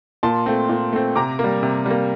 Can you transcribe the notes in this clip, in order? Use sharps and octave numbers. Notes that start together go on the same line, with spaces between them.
A#2 A5 C6
A3 C4
A#2
A3 C4
C3 A#5 D6
A#3
G3
C3
G3 A#3